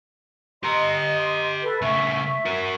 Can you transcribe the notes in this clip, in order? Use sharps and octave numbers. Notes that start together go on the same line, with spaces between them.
G4 D#5 A#5 C6
A4 B4
C#3 A3 E5 C#6
F#4 A#4